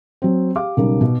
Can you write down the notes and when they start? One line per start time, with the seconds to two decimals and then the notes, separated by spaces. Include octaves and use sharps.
0.22 F#3 C4
0.55 G4 F5 D6
0.77 B1 C#3 G3 A#4
1.01 B2